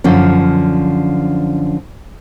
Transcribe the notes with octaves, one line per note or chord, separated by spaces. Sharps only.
F#2 D3 F3 C#4